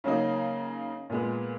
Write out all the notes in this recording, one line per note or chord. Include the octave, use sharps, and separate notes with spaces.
C#3 F#3 A#3 D#4
A#2 G#3 B3